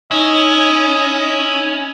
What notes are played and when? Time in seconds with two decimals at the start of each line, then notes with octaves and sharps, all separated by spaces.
0.11 C#4 D#4 E4 D#5